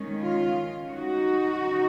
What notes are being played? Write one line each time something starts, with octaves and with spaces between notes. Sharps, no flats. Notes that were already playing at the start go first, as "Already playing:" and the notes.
Already playing: D#3 G#3 C#4
F4
D#4 F#4
C#3 F#3